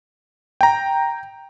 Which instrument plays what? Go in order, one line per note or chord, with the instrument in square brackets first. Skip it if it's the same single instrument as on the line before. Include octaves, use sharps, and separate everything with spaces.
[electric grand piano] G5 A#5